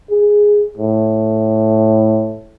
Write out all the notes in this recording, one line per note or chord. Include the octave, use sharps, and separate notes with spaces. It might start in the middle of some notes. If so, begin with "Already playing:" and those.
G#4
A2